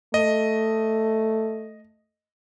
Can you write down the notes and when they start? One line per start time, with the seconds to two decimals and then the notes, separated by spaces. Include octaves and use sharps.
0.14 A3 D#5